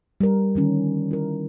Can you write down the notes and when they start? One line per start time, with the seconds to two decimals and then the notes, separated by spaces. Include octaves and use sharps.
0.20 G3 A#4
0.55 D3 D#3 C#4
1.11 E4 A#4